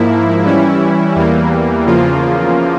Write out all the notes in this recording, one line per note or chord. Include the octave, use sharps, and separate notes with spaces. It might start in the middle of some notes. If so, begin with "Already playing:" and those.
Already playing: G#2 F3 A#3 E4
E3 G3 C#4 E4
E2 E3 G3 A#3
E2 C#3 F3 A#3 F4